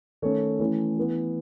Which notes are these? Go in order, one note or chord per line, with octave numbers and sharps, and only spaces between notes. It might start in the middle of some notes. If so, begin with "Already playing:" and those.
D#3 A3 C#4 A4 C#5
E3 A3 C#4
E3 B3